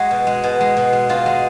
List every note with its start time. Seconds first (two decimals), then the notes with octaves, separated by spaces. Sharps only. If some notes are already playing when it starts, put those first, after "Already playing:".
Already playing: G#3 F#4
0.11 B2
0.27 G#3
0.44 B2
0.61 G#3
0.77 B2
0.93 G#3
1.09 B2 F4
1.26 G#3